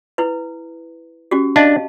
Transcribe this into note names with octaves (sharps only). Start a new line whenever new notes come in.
E4 B4
C#4 F#4 G4
D4 D#5 F5 A5